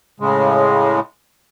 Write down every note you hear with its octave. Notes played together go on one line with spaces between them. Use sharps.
A2 C#3 G#3